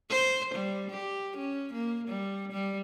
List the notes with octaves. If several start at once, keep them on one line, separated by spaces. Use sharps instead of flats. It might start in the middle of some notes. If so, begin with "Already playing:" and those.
C5
G3
G4
C#4
A#3
G3
G3